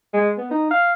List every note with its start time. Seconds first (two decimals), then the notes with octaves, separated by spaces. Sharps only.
0.14 G#3
0.38 B3
0.51 D#4
0.71 F5